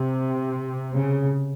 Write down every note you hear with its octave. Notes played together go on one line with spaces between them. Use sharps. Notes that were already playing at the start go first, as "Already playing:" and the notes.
Already playing: C3
C#3